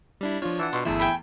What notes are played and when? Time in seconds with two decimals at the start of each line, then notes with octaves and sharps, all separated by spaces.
0.21 G3 D4 E4
0.42 F3 D4 F4 C#5
0.59 E3 F#5 A5
0.73 B2 C6
0.85 G1 E2 A3 E4 G#4 A5 E6
1.00 G5 G#5 B5